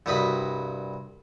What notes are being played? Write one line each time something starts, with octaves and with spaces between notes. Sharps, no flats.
C2 G2 F#4 D#5 B5